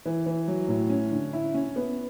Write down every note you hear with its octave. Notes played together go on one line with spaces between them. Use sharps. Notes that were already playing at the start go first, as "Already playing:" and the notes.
E3
E3
F#3
A2
C#4
D3
E4
C#4
B3